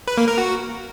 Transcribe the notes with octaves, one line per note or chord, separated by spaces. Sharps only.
B4
A#3
A#4
F#4